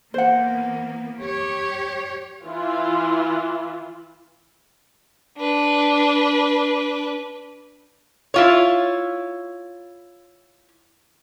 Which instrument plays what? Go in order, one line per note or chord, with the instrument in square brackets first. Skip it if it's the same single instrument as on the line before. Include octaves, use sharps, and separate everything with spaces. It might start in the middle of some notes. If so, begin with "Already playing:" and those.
[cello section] E3 A#3 B3 [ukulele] C5 F#5
[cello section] G4 C#5
[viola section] E3 E4 F4
[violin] D4 B4
[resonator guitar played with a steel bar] E4 F4 C#5